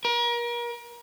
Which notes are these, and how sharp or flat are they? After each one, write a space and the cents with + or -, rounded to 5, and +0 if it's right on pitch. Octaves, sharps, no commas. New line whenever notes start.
A#4 +35